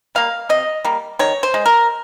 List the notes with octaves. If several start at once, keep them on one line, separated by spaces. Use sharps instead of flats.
G3 A#3 F5
C3 D#5
G3 A#3
D#3 C#5
C5
G#3
A#4